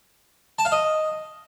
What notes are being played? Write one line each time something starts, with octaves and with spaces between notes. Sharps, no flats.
A5
F5
D#5